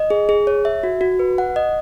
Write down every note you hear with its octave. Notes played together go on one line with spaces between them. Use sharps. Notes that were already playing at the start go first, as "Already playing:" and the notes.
Already playing: D#5
G#4
G#4
C#5
E5
F#4
F#4
B4
F#5
D#5